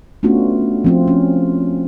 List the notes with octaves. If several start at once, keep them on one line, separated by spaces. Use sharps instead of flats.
A3 B3 C#4 D4 F4 F#4
F3 C4 F4
C#4